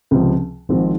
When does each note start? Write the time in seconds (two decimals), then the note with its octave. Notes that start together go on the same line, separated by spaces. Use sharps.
0.11 C#2 C3 F3
0.69 G#1 G#2 F3 C4